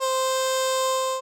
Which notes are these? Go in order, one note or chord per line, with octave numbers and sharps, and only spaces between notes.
C5